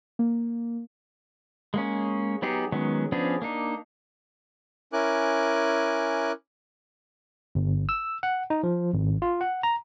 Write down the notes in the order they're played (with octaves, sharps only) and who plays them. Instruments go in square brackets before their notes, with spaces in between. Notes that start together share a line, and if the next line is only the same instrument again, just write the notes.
[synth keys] A#3
[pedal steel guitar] G#3 A#3 C#4
F#3 B3 D#4 G4 G#4
D#3 F#3 G#3 B3 C#4
F3 B3 C#4 D4 G#4
A#3 D4 D#4
[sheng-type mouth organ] C#4 E4 A#4 G#5 D6 F#6
[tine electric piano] G1
E6
F#5
D#4
F3
G#1
F4
F#5
A#5